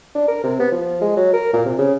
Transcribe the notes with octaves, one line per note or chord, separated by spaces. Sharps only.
D4
A#4
C3
B3
F3
G#3
F#3
A#4
A#2
C3
C#3